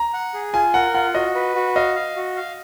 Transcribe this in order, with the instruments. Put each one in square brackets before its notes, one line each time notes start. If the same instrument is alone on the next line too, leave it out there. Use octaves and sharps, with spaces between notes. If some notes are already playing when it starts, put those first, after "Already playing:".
Already playing: [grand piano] A#5
[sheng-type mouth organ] F#5
G#4
[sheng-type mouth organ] F4 [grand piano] G#5
[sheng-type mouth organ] A#4 [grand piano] F#5
[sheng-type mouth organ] F4 [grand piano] F#5
[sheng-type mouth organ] F#4 [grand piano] D#5
[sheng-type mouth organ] B4
F#4
[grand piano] D#5 [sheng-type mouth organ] F5
[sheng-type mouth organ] F5
F#4
F5